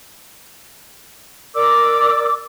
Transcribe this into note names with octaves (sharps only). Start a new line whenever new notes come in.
A#4 D5 D6 E6